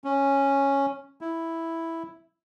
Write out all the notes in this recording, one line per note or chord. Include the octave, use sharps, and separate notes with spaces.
C#4
E4